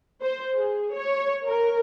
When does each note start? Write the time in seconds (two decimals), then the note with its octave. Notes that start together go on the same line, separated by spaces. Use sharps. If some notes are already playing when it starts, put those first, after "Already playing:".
0.22 C5
0.56 G#4
0.95 C#5
1.46 A#4